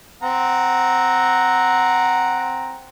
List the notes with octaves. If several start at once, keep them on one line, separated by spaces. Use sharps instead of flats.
C4 F#5 A#5